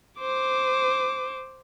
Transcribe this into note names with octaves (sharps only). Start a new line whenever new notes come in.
C5 D6